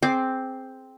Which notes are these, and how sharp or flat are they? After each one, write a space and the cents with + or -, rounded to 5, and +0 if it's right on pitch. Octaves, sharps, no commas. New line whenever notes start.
C4 +0 G#4 +25 D6 +0